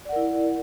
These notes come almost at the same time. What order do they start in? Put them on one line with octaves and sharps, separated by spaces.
D5 F#5 A#4 E4